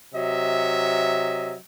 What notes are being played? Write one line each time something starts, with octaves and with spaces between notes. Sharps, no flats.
C3 F#3 D#5 E5